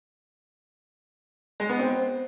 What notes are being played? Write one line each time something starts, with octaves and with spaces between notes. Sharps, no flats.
G#3
B3
C4